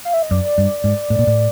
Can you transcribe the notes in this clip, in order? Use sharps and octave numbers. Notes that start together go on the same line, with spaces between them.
F5
E5
D#5
F#2 D5
G2
G#2
A2
A#2
A2